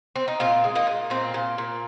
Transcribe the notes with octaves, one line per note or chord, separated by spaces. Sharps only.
C4
D#4
A#2 C4 F4
G#3
A#3 D#4
A#2
A#2 C4
A#2
A#2